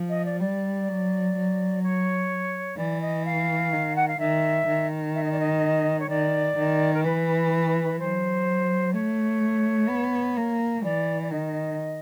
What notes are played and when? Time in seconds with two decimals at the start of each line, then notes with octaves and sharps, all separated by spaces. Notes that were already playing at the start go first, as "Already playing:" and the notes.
Already playing: F3
0.09 D#5
0.25 D5
0.40 G3 D5
0.88 F#3
1.36 F#3
1.82 C#5
2.77 E3 D5
3.01 D#5
3.25 F5
3.73 D#3
3.95 F#5
4.07 F5
4.19 D#3 E5
4.67 D#3
5.14 E5
5.23 D#5
5.31 D5
5.39 D#5
5.99 C#5
6.09 D#3 D5
6.57 D#3
6.93 A#4
7.04 E3 B4
7.98 F#3 C5
8.93 A3 C#5
9.89 B3
10.37 A#3
10.83 E3 D5
11.22 D5
11.30 D#3 D#5